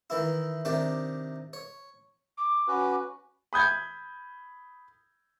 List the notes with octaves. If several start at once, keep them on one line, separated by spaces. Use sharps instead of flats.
D#3 E3 E4
C3 D#3 D4 D5
C#5
D6
C#4 F#4 B4
B5 D#6 G6 G#6